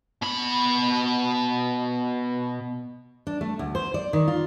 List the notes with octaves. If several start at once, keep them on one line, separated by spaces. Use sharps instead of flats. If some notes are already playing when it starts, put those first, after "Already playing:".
B2 B5
D4
A3
D2
C5
D5
D#3
F4